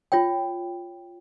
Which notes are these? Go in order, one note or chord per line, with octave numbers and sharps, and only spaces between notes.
F4 C#5 G5